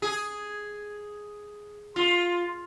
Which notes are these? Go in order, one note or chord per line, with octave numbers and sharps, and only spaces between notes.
G#4
F4